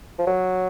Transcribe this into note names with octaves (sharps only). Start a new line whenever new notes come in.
F3
F#3